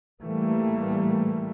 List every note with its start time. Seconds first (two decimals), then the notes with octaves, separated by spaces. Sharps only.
0.23 A2 E3 G3 A3 A#3